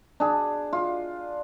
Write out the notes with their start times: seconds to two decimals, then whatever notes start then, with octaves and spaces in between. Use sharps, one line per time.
0.20 D4 G#4
0.73 F4